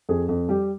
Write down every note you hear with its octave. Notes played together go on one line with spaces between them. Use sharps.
F2 G#4
F2
G3 G4